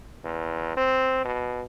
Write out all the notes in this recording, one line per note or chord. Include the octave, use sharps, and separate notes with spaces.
E2
C4
B2